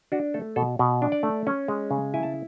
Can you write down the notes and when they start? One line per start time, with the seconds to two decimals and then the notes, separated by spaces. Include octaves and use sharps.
0.12 D4 F#4
0.34 A3 A4
0.56 B2 A4
0.79 B2
1.02 D4
1.12 D5
1.23 A3
1.47 C#4
1.68 G#3
1.91 C#3
2.14 E4 G#5
2.23 A5